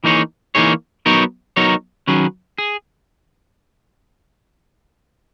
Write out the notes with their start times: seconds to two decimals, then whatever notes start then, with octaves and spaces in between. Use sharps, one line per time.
0.04 E3 A#3 D#4 G#4 C#5
0.55 E3 A#3 D#4 G#4 C#5
1.06 F#3 B3 D#4 A#4 C#5
1.57 F#3 B3 D#4 A#4 C#5
2.07 D#3 F#3 C#4 G#4 B4
2.58 G#4